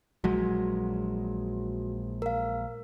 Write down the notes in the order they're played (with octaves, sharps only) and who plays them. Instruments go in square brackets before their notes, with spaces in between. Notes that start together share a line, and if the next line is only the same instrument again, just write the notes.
[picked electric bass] A#1 F#3 G#3 [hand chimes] F#4
[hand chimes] A#4 F5